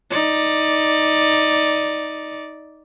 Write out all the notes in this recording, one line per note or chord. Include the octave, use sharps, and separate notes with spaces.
D#4 D5